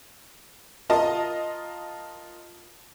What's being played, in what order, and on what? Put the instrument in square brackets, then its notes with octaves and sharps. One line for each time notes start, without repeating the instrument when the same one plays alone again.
[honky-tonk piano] F4 A#4 D#5 [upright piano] A5